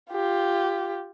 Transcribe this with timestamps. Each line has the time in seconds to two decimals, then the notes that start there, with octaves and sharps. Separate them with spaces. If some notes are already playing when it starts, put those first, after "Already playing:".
0.12 F4 G4